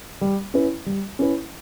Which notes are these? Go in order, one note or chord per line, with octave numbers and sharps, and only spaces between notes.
G3
C#4 E4 B4
G3
C#4 E4 B4